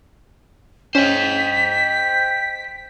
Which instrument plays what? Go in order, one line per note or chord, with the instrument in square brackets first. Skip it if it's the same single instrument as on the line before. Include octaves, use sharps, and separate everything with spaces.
[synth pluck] C#4 [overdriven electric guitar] C5 D#5 [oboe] G5 [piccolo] B6